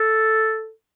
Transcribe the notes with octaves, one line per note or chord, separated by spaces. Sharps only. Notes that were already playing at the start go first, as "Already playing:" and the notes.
Already playing: A4